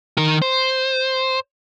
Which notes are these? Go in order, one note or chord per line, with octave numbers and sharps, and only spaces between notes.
D#3 A#4
C5